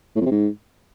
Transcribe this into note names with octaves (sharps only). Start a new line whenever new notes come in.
A2
F2
C3
G#2